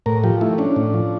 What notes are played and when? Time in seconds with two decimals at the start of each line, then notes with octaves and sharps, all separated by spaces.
0.06 A2 A#4
0.24 F3 G4
0.41 A3 E4
0.58 C#4 D4
0.76 A2
0.94 F3